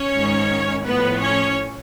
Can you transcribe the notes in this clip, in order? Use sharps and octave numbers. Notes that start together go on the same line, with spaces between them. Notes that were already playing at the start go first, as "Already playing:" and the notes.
Already playing: C#4 C#5
G#2 D#3
A2 F3 B3 B4
C#4 C#5